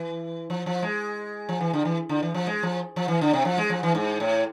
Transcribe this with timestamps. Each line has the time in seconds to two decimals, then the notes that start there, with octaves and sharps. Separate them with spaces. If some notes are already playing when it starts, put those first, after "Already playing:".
Already playing: E3
0.50 F3
0.66 F3
0.82 G#3
1.49 F3
1.61 E3
1.73 D3
1.85 E3
2.09 D3
2.23 E3
2.34 F3
2.47 G#3
2.63 F3
2.96 F3
3.08 E3
3.21 D3
3.33 C3
3.45 F3
3.58 G#3
3.70 F3
3.83 E3
3.95 G#2
4.20 A2